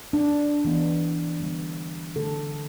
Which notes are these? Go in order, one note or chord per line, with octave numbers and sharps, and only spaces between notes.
D4
E3 B3
D3 G3 B3
D3 A3 A4